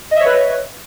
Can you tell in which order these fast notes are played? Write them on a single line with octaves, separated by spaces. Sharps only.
D#5 E5 C#5 B4